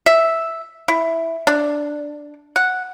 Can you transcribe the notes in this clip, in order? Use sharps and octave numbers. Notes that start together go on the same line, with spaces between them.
E5
E4
D4
F#5